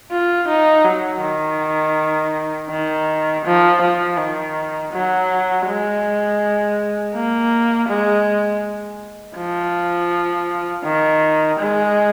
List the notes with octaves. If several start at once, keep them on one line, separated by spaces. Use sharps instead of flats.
F4
D#4
F#3
D#3
D#3
F3
F3
D#3
F#3
G#3
A#3
G#3
F3
D#3
G#3